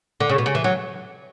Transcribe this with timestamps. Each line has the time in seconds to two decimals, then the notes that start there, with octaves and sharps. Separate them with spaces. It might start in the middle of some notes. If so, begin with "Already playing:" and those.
0.20 D3
0.30 C#3
0.38 B2
0.46 C#3
0.55 E3
0.64 F#3